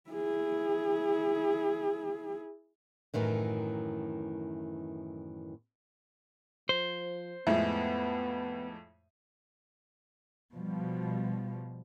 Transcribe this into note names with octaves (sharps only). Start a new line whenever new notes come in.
E4 G#4
F#2 A2 D#3 E3
F3 C5
F2 A2 G#3 B3 E5
B2 F3 G3